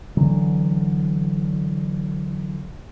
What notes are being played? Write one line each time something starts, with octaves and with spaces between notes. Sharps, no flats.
D3 E3 F#3